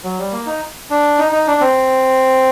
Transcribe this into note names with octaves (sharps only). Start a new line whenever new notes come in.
F#3
G3
A#3
D#4
D4
D#4
D#4
D4
C4